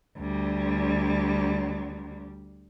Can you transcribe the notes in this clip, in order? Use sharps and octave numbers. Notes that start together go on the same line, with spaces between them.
D2 G3